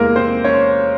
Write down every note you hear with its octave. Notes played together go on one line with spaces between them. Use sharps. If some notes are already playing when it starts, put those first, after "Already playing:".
Already playing: E2 C3 E3 G#3 A#3 A#4
C4 C5
C#4 C#5